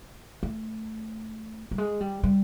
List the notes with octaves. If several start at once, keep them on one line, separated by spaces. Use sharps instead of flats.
A3
G3
G#3
G3
G3